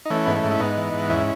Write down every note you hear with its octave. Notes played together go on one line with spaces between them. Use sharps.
D#4
E3 A3 C#4
G#2 B3
A3 C#4
G#2
E4
G#2 B3 D#4
E3
G#2
E2 C#4 E4